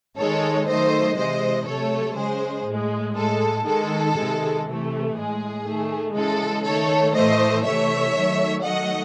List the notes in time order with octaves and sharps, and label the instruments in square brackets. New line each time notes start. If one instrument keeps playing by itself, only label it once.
[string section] D#3 G#3 A4 C#5
D#3 F#3 A3 C5 D#5
C3 E3 G#3 C5 D#5
C3 F#3 A3 A4 C#5
C#3 G#3 G#4 C5
A2 G#3
A2 G#3 A4
D#3 G#3 A4
C3 D#3 G#3
C3 E3 A3
A2 G#3 G#4
D#3 A3
C#3 E3 G#3 A4
D#3 A3 A4 C#5
A2 E3 A3 C5 D#5
C3 E3 A3 C#5 E5
D#3 F#3 A3
D#3 F#3 A3 D#5 F#5